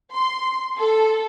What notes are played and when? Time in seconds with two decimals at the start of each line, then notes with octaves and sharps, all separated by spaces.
0.12 C6
0.77 A4